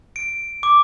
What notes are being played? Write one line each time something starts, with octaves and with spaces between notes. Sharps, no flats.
D7
D6